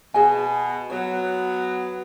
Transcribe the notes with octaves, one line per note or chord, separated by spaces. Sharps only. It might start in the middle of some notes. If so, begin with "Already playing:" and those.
B2 G#4 D#5 G#5
F#3 B3 C#5